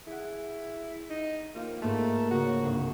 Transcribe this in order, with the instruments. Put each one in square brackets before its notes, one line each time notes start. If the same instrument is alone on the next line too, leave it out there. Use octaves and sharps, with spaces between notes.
[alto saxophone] E4 [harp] G#4 F#5
[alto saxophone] D#4
[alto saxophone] A#3 [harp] F4 G4 C5
[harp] G#2 C5 B5 [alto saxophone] A3 [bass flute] A#3
[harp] C#3 [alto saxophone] F#4
[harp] G1 C2 C7